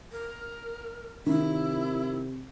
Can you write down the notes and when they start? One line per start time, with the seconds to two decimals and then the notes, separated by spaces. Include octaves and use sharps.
0.12 A#4
1.26 C3 D#3 E4